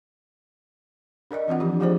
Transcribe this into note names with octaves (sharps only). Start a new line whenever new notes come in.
D4 A#4 D5 D#5
E3 C4 F4 F#5
F3 D4 G4
F3 A3 D4 F4 G#4 C5